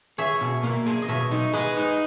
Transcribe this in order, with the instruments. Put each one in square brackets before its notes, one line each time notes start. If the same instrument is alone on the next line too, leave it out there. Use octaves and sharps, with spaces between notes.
[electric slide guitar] G#4 [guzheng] C#5 E5
[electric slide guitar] B2
A#3
G#4
[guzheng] D#5
[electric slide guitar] B2 [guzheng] C#5 E5
[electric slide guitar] D#4
[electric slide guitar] G#4 [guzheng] B4 D#5
[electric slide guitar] D#4